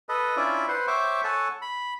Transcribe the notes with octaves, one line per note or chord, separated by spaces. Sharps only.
A4 B4 D#5
C#4 D4 E4 F4 D5 E5
B4 C5 F#5 C6
C5 C#5 E5 G5 C#6 D6
A4 C#5 F#5 G#5 A5
B5